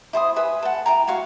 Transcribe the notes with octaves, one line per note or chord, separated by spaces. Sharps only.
E4 C5 G#5 D#6
B4 E5 G#5
A4 F#5
E4 G5 A#5
F#4 C#5 F5 C#6